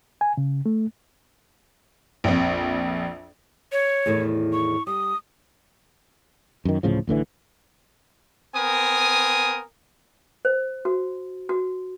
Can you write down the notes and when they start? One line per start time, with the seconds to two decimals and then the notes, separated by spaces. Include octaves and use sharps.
0.21 G#5
0.37 C#3
0.66 A3
2.24 A#1 F2
3.72 C#5
4.06 E2 A2 D#3
4.53 C#6
4.87 G3 D#6
6.65 F#2 D#3
6.83 D1 A2 C#3 F3
7.07 A1 A2 D3 E3
8.55 B3 C4 A#4 G#5 D#6
10.45 C5
10.85 F#4
11.49 F#4